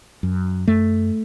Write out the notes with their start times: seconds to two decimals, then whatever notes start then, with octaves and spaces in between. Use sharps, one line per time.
0.23 F#2
0.68 F#2 A3